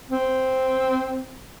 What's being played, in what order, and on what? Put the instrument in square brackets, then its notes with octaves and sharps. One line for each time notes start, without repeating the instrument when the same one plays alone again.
[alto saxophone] C4